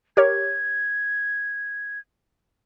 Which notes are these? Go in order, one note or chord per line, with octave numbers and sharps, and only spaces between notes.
G4 A#4 C#5 G#6